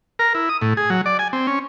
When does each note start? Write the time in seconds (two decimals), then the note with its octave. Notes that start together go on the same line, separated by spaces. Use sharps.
0.19 A#4
0.35 E4
0.49 D#6
0.61 A2
0.77 G#4
0.90 F#3
1.06 D5
1.19 G#5
1.33 C4
1.47 C#4